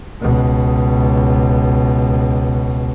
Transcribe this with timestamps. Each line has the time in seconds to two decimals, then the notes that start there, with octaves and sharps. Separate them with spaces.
0.21 C#2 B2